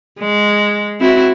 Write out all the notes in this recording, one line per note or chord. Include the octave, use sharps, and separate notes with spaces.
G#3
C4 E4 F#4